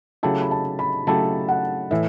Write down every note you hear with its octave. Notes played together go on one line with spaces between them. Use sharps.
C#3 F#3 A3 E4 G4 A5
B5
A5
B5
C#3 F#3 A3 E4 G4 A5
F#5
A2 E3 E5